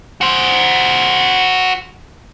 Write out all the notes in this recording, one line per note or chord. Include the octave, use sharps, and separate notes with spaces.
F#4 C5